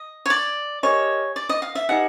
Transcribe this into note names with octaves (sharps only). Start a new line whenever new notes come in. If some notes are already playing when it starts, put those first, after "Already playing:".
Already playing: D#5
C#5
D5
G4 A#4 C#5 D#5 G#5
D5
D#5
F5
E5
D#4 G4 B4 D#5 F#5 G#5